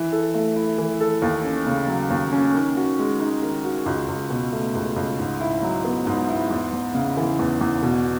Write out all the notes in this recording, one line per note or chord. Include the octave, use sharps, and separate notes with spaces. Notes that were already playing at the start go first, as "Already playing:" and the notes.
Already playing: E3
A4
A3
E4
E3
A4
D#2
C#4
C#3
F#3
D#2
C#4
D#3
F#4
G#3
D#4
D#3
F#4
C#2
C#2
B2
A3
C#2
C#2
G#2
E4
F#3
B3
G#2
E4
E2
E2
C#3
E3
E2
E2
B2